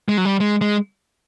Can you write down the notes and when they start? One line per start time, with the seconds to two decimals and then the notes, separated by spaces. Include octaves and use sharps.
0.08 G#3
0.17 F#3
0.25 G3
0.40 G#3
0.61 G#3